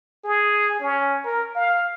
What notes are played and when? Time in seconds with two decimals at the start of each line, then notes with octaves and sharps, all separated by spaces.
0.24 G#4
0.80 C#4
1.25 A#4
1.55 F5